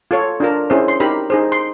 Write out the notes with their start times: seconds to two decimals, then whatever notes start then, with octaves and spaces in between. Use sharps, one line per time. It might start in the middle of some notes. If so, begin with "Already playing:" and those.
0.11 F4 A4 C#5
0.40 D4 F4 A#4
0.70 C#4 E4 G#4 C5
0.88 C6
1.00 D#4 G4 A#4 B5
1.30 D#4 G#4 C5
1.52 C6